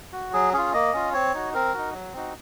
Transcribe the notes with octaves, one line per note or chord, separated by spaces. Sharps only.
F#4
F#3 G#4
C#4 F4 G#4
A#3 D#5
C#4 F4
C4 C#5
D#4 F#4
C4 A#4
D#4 F#4
F#3
C4 D#4 F#4